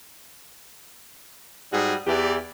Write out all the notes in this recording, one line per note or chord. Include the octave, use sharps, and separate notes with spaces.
G#2 G3 F#4 G#4
E2 E3 G4 D5